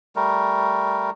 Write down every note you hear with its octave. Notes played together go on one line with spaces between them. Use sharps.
G3 A3 A#4